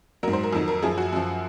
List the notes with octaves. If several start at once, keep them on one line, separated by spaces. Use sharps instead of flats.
G#2 F#3 A#4
C5
A#4
F2 D#3 F#3
A#4
F#2 F3 G#4
F#4
F#2 F3